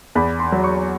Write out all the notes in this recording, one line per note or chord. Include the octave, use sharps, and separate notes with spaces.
E2 B5
C6
F#3
C#6